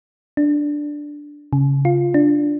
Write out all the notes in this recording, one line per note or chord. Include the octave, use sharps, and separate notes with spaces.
D4
C#3
F4
D4